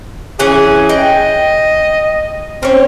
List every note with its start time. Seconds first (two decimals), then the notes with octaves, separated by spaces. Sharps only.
0.39 E3 F#3 C#4 G#4
0.89 D#5 G5
2.63 C4 C#4 C#5